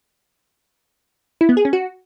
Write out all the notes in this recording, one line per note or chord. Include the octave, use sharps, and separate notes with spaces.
E4
B3
G#4
C#4
F#4